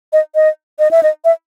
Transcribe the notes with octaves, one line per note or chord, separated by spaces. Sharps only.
D#5
D#5
D#5
E5
D#5
E5